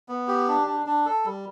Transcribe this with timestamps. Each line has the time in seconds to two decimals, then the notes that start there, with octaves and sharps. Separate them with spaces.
0.09 B3
0.28 G4
0.48 D4
0.67 D4
0.86 D4
1.06 A4
1.25 G3